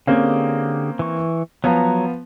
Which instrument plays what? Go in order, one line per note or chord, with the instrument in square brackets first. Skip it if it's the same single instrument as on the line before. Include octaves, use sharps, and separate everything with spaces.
[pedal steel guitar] D3 G4 G#4 [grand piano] A#3 C4 C#4
[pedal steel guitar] E3 C#6
[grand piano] F3 B3 [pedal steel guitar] F#3 C#5 A#5